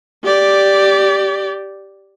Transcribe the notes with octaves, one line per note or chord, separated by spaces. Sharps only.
G4 D5